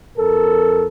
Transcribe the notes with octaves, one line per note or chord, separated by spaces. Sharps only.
F2 A4 A#4